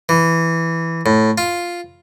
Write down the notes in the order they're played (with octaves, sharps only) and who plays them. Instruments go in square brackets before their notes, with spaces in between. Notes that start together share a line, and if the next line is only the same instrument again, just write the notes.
[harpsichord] E3
A2
F4